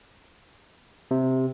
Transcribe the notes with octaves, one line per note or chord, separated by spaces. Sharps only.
C3